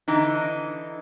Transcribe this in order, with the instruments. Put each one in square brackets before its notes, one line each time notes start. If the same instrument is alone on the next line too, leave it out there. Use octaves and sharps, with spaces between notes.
[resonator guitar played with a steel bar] D3 E3 D#4